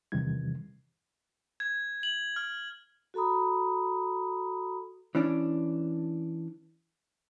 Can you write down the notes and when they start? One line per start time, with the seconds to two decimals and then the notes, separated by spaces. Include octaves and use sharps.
0.12 E2 C3 D#3 E3 G3 G#6
1.60 G#6
2.03 F#7
2.36 F6
3.14 F#4 A4 A#5 B5 D#6
5.15 E3 C#4 D4